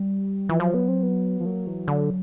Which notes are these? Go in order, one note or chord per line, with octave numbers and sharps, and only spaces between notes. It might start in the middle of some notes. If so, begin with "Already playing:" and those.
Already playing: G3
E3 F3
F3 F#3
B3
C4
B3
F3
F#3 A#3
E3
D3